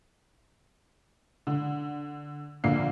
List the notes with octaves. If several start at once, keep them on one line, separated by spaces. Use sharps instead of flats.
D3
A#1 D3 A#3 C7